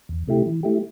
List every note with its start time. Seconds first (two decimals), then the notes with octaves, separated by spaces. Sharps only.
0.09 E2
0.27 C3 A3 E4 G4
0.46 E3
0.63 A3 E4 G4